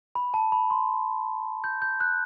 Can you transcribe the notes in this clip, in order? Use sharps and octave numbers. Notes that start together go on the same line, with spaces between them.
B5
A5
B5
C6
G6
G6
F#6